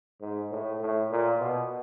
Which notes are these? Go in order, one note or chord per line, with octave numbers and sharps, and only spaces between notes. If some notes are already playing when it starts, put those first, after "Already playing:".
G#2
A2
A2
A#2
B2